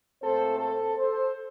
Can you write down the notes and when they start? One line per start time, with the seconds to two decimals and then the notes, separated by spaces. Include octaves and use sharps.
0.22 A#2 A3 C4 A4 C5
0.60 A4 C5
0.97 A4 C5